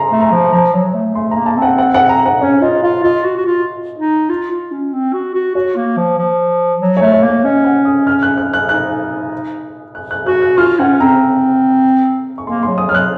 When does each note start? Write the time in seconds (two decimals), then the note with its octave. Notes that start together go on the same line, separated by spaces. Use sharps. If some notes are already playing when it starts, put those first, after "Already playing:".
Already playing: A#5 C6
0.10 A3
0.21 A#5
0.31 F3
0.52 F3 A#5
0.73 F#3
0.94 A3
1.15 A3 C6
1.31 A#3 A#5
1.46 A5
1.57 C4
1.62 F#5
1.78 F#5
1.94 F#5
2.09 A#5
2.26 F#5
2.41 C#4 C#5
2.62 F4 D#5
2.83 F4 F5
3.04 F4 D#5
3.25 F#4
3.37 F#4
3.46 F4
3.98 D#4
4.29 F4
4.50 F4
4.72 C#4
4.93 C4
5.13 F#4
5.35 F#4
5.55 F#4 C#5
5.76 A#3
5.97 F3
6.18 F3
6.81 F#3
6.97 C#5
7.02 A3
7.12 C#5
7.23 A#3
7.28 C#5
7.44 C#4 D#5
7.64 F#5
7.85 D#6
8.07 F6
8.23 F#6
8.38 F#6
8.53 F#6
8.69 D#4 F#6
9.95 F#6
10.11 F#6
10.26 F#4 F#6
10.42 F#6
10.58 F4 F6
10.79 C#4 F#5
11.00 C4 A#5
12.38 C#6
12.47 A#3 C6
12.63 F#3 C6
12.78 D#6
12.89 F#3 F6
12.95 F#6